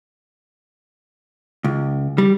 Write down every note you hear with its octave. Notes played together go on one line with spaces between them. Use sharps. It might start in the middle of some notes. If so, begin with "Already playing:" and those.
C#2
G3